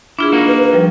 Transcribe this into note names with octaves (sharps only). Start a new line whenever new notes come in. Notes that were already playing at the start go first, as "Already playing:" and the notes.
D4 E4 F4 G#4
A#3 D#4 F#4
B4
B4
F3 G3